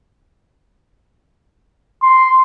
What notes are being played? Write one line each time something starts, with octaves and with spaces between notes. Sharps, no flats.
C6